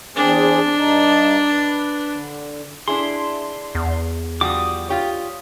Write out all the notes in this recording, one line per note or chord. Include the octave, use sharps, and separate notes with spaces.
E2 C4 D4 G#4
G2 D#4 A5
B4
D3
D4 E4 G#4 C6
E2
F3 G3 F#4 D6 D#6
F4 G4 C#5